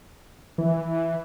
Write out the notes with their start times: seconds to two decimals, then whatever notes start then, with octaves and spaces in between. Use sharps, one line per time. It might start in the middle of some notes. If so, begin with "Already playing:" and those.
0.58 E3